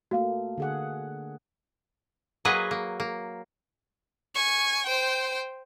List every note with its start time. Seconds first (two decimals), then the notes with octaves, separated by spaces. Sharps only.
0.11 A3 A#3 F#4 F5
0.58 D3 G#4 F#5
2.45 F#3 A#3 G#4 B4 D#5
2.71 A#3
3.00 A#3
4.35 G#5 C#6
4.86 C5 G5